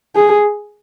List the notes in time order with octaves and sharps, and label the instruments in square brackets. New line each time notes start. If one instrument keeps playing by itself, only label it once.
[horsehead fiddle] G#4